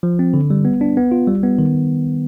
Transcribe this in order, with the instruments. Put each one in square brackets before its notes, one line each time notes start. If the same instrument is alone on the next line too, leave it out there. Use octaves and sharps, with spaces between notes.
[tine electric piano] F3
C4
D3
G3
B3
D4
B3
F4
G3
B3
D#3